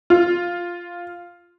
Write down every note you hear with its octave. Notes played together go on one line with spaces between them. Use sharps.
F4